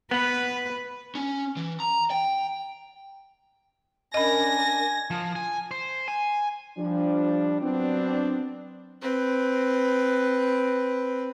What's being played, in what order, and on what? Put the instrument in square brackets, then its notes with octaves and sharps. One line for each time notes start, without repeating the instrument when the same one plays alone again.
[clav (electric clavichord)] B3 F#5 [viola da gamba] B4
[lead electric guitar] C#4
E3
A#5
G5
[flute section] C#4 D4 A#4 [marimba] D#5 B5 [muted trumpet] G#5 [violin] A#6
[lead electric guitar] F3
G#5
C5
G#5
[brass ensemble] F3 G3 D4
F#3 B3 C4 D4
[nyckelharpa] C4 B4